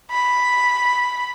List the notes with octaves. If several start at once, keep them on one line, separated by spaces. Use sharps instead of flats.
B5